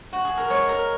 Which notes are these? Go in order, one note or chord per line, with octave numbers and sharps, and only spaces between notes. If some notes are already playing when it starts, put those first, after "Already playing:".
Already playing: D#4
F#4
G#4
A#4
G#3 C#5
A#4